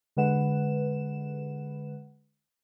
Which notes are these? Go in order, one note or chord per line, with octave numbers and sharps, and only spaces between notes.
D3 G#3 B4 F#5 E7